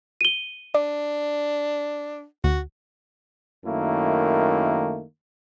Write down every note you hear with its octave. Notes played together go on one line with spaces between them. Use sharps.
D#7 G7
D4 D5
D2 F#4
F#2 D#3 A3 A#3 E4